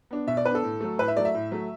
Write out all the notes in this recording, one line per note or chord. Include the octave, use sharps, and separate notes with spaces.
B3 D4
B2 E5
D5
B3 D4 B4
A4
A2
F#3 A3
A2 B4
E5
F#3 A3 D5
E5
A2
F#3 A3